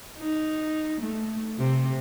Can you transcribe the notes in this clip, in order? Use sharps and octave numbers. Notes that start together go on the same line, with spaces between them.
D#4
A3
C3